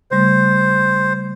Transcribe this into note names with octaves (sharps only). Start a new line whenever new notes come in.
C#3 G3 A3 C5